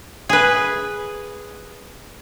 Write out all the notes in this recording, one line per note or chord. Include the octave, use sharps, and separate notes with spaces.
G#4 B4